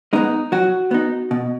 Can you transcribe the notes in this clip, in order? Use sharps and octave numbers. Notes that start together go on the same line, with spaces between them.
G#3 B3 D#4
F#3 F#4
B3 D#4
B2